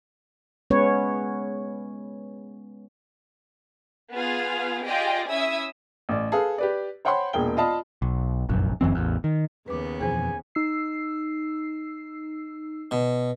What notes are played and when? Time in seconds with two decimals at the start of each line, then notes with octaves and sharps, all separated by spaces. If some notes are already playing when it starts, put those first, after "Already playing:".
0.70 G#3 B3 C#4 B4 C#5
4.13 B3 F4 G#4 F5
4.84 F4 G4 G#4 D5 D#5 G5
5.28 C#4 E4 E5 D#6 E6
6.09 A1 D5
6.32 G#4 A4 B4 F5
6.58 G4 B4 D5
7.05 C5 C#5 F#5 G5 B5 C6
7.33 E1 A#2 G#4 A#4 G5 G7
7.57 F4 D5 D#5 F5 A5 B5
8.02 B1
8.49 F1 A#1 F#2
8.81 F#1 F#2 E3 C4
8.95 A1 E2
9.24 D#3
9.68 D#2 C#3 B3 B4 D6
10.01 F2 B2 E3 G#4 C5 G#5
10.55 D#4 E6 C7
12.91 B2